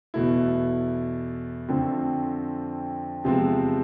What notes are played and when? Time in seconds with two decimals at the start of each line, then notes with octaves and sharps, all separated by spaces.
0.14 E2 B2 A3 E4
1.68 F2 D3 F3 A3 C4
3.24 E2 C3 F3 G#3 C4